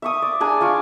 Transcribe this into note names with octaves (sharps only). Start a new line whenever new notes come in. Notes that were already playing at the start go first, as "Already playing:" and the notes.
E5 C#6 D#6
D5
D4 G#4 G#5 A#5
F4 F5 C#6 D6